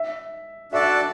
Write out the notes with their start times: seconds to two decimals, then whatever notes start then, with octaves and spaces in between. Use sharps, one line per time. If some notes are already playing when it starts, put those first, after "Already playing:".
Already playing: E5
0.72 D4 F#4 A4 D5 E5 A5